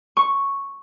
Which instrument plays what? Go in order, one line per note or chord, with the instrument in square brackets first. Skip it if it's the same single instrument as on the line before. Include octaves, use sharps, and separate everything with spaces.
[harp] C#6